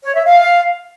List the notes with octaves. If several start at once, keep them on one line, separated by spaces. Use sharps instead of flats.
C#5
E5
F5